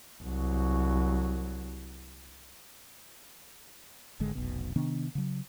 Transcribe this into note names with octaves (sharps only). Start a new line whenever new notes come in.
C2 F#3
G#1 D3 G#3
F1 B1 B2
C3 D#3 B3 D4
C#3 F#3